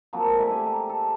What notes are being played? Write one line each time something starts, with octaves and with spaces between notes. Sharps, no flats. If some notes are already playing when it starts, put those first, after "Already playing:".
F3 F#3 A#3 C4
G#3
A3 D5 E5 G#5
E4 G4 G#5
A#5
A4